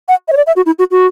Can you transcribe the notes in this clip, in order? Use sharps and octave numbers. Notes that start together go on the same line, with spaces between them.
F#5
E5
C#5
D5
E5
F#4
E4
F#4
F#4